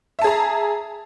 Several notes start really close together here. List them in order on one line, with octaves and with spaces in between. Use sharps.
E5 A5 G#4 A#5